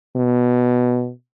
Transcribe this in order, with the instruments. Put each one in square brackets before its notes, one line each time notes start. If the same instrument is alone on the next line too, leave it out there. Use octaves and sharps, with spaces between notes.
[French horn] B2